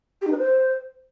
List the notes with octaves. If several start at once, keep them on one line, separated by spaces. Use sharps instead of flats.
G4
D#4
B4
C5